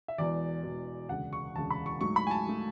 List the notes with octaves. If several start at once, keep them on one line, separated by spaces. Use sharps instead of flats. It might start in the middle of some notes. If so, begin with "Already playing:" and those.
E5
E1 E2 B2 D5
E1 E2 B2
E1 D2 C#3 F#5
C#6
E1 D2 C#3 A5
B5
C#6
G#2 F#3 A3 C#6
B5
G#5
A5
F#3 A3